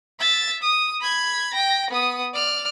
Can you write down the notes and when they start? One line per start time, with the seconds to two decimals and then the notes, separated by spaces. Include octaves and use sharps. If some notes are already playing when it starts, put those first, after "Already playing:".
0.20 E5 A6
0.63 D#6
1.01 B5 G#6
1.54 G5 A#6
1.91 B3 D#6
2.34 D5 F6